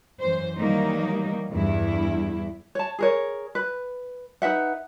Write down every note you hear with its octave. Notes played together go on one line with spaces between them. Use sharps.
F#2 E3 C5
D#3 E3 F#3 G3 A#3 D#4
E2 G2 E4
C#5 A5
G#4 A#4 C#5
B4
D#4 B4 E5 F#5